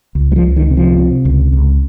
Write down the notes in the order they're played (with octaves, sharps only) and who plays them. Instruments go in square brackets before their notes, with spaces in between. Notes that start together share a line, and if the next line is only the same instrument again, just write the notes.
[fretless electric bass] C#2
G3
F3
C#2
D#3
C3
F3
C3
C#2
C#2